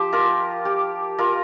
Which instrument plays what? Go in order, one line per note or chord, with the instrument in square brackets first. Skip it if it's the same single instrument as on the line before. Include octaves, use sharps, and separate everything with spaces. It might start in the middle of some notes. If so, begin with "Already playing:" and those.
Already playing: [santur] F3 G4 C5
F4 A#4
G4
F4 A#4